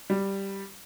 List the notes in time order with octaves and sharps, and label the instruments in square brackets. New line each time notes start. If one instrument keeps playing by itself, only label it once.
[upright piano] G3